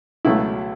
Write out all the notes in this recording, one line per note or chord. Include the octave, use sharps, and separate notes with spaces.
C#2 B2 F#3 A3 E4